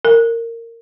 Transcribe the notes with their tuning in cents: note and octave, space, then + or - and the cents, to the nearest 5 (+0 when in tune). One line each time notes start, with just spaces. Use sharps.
A#4 -20